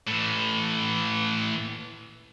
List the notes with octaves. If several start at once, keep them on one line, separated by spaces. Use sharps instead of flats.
A2 E3